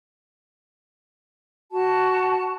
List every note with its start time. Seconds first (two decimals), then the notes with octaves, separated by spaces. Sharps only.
1.71 F#4 A5